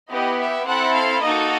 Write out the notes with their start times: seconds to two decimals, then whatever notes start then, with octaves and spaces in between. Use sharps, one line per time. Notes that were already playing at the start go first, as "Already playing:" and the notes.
0.10 B3 E4 G4 D#5
0.39 E5
0.67 C4 E4 A4 F#5
0.95 F5
1.23 A#3 D#4 F#4 A4 D#5